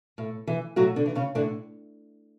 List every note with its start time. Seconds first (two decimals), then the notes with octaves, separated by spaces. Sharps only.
0.18 A2
0.47 E3
0.76 A2 F#3 F#4
0.96 D3 D4
1.06 E3
1.15 C#3 C#4
1.35 A2 D3 D4